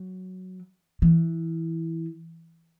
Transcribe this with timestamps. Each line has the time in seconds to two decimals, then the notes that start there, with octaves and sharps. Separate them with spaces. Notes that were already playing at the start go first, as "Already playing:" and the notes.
Already playing: F#3
1.02 E3